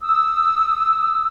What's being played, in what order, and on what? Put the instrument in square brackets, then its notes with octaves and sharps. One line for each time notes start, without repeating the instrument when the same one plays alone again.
[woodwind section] D#6 E6